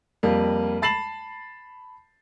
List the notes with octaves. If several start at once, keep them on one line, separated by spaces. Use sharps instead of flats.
F2 G3 A#3
A5 B5 A6 C7 E7 F#7